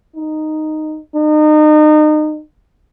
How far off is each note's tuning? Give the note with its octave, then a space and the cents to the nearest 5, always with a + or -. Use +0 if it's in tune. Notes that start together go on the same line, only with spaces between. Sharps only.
D#4 -5
D#4 -30